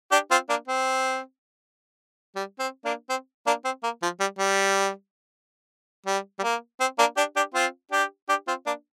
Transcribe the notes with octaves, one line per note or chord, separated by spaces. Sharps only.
D4 G4
C4 F4
A#3 D4
C4
G3
C4
A#3 D4
C4
A#3 D4
C4
A#3
F3
G3
G3
G3
G3
A#3
C4
A#3 D4
D4 G4
D4 G4
C4 F4
D4 G4
D4 G4
C4 F4
A#3 D4